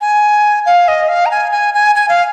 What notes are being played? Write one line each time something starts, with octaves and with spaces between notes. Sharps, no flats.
G#5
F5
D#5
F5
A#5
G#5
G#5
G#5
G#5
F5